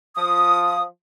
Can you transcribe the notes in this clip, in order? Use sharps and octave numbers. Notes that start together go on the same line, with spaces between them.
F3 D#6